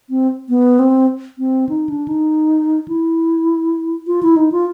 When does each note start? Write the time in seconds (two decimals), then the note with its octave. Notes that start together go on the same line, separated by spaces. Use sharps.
0.10 C4
0.49 B3
0.79 C4
1.38 C4
1.69 D#4
1.89 D4
2.08 D#4
2.88 E4
4.07 F4
4.23 E4
4.36 D#4
4.52 F4